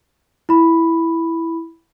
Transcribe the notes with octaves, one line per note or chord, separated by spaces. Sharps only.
E4 B5